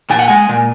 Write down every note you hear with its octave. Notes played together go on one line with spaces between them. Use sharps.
A#2 G#5
F#5
G#3 G#5
A#2